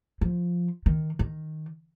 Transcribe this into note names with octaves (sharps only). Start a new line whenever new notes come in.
F3
D#3
D#3